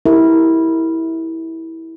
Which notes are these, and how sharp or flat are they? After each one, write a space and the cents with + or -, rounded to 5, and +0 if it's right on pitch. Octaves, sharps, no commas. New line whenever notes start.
E4 -15 G4 +0 A#4 -15